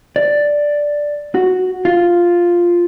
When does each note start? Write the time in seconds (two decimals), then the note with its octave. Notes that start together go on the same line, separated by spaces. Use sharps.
0.16 D5
1.35 F#4
1.85 F4